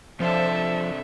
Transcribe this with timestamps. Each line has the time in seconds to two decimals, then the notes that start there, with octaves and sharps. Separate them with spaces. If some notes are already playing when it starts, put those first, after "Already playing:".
0.20 C3 F3 D4 A4 C5 E5 A5